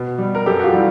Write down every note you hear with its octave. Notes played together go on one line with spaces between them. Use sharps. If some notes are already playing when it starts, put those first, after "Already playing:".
Already playing: B2
G3
A#4
F#2 G4 A4
F#4
F4 G4
E3 G3